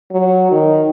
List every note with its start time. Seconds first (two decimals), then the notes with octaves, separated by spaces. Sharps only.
0.11 F#3
0.51 D#3